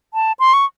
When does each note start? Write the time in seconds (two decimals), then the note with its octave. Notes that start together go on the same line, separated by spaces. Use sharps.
0.14 A5
0.39 C6
0.54 C#6